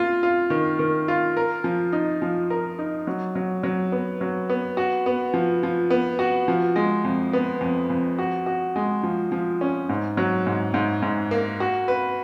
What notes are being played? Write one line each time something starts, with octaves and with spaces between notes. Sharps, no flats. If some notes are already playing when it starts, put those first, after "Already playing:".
Already playing: A#3 F4
F4
D#3
D#3
F4
A#4
F3
D#4
F3
A#4
D#4
F#3
F#3
F#3
B3
F#3
B3
F#4
B3
F3
F3
B3
F#4
F3
G#3
F2
B3
F2
F2
F#4
F#4
G#3
F3
F3
C#4
G#2
F#3
G#2
G#2
G#2
A#3
F#4
B4